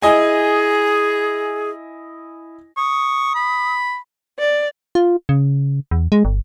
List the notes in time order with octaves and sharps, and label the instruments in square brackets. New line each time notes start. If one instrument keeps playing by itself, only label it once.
[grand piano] E4 D#5 G#5 [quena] G#4
[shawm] C#6 [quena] D#6
[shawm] B5
[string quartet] D5
[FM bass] F4
C#3
E2
G#3
G1